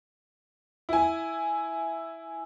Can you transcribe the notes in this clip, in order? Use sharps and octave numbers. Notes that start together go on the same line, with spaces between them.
E4 G#5